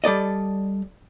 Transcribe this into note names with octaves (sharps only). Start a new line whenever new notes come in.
G3 A4 D5 D#5